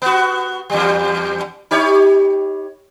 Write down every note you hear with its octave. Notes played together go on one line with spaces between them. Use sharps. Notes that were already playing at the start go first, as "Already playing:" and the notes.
B3 F#4
E2 G3
D#4 G4 C#5